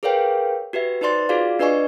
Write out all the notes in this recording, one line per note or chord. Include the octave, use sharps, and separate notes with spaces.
G#4 A#4 B4 C#5 F5 G5
F#4 G4 B4 E5
D#4 B4 C5 D5 C6 A6
F4 F#4 G#4 D5 F5
D4 B4 D5 D#5 G#5 C#6